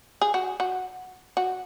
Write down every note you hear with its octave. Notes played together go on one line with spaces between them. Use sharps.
G#4
F#4
F#4
F#4